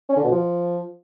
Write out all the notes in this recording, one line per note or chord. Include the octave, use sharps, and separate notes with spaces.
C#4
D3
B2
F3